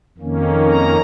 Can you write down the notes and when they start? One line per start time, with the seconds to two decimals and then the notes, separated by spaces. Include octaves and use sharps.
0.18 F2 D#3 A#3 C#4
0.67 A#5